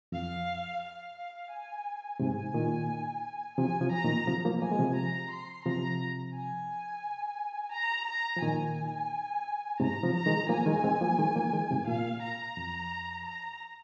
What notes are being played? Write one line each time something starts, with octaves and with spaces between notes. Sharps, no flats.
F2 F5
F5
G#5
G#2 C3 G#5
A#2 D#3
C3 F3 G#5
C3 F3
A#5
A#2 D#3
C3 F3
F3 A#3
F3 A#3 G#5
G#3
C3 F3
A#5
C6
C3 F3 A#5
G#5
A#5
A#5
F3
A#2 D#3 G#5
G#2 C3 A#5
C3 F3
A#5
D#3 G#3
F3 A#3 G#5
D#3 G#3
G#3 C4
F3 A#3
D#3 G#3
F3 A#3
D#3 G#3
G#2 C3
A#2 F5
A#5
F2
A#5